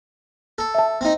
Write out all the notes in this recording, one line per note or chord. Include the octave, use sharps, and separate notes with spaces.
A4
E5 A5
C4 D#4